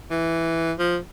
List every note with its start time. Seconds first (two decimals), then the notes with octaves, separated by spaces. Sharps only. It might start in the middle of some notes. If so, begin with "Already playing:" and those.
0.11 E3
0.79 F3